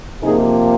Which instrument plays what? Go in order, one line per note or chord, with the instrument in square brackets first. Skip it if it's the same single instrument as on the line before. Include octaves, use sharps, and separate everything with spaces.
[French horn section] C3 F3 A#3 D#4 G#4